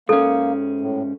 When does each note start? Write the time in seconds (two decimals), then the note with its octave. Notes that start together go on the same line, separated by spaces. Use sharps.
0.09 G#2 A#3 C#4 A4
0.80 A2